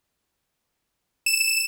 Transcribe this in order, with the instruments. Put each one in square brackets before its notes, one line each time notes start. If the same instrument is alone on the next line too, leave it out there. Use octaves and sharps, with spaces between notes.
[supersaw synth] E7